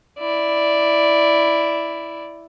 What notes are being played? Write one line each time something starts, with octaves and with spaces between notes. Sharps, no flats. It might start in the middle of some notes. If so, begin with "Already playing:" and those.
E4 D5